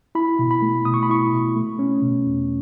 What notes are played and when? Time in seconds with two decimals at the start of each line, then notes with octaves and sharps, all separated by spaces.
0.15 E4 B5
0.39 B2
0.51 B5
0.62 A3
0.85 B2 D#6
0.94 C#6
1.03 B5
1.09 E4 C#6
1.33 B2
1.56 A3
1.79 C#4
2.02 B2
2.26 E2